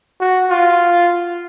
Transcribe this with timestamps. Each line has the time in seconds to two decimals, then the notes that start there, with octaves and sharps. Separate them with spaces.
0.21 F#4
0.50 F4